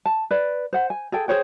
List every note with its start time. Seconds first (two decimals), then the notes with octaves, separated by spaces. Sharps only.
0.06 A5
0.31 B4 D5
0.73 C5 F#5
0.90 G#5
1.12 G#4 A4 G5
1.28 G#4 C5 C#5 G5